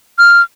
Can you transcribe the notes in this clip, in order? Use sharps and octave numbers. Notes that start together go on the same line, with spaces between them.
F6